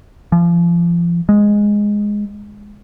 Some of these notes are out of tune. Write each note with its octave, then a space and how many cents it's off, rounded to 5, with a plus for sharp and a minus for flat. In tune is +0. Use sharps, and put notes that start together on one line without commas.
F3 -35
G#3 -5